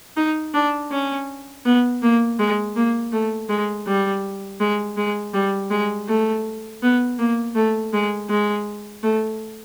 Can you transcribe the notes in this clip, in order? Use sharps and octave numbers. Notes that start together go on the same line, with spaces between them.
D#4
D4
C#4
B3
A#3
G#3
A#3
A3
G#3
G3
G#3
G#3
G3
G#3
A3
B3
A#3
A3
G#3
G#3
A3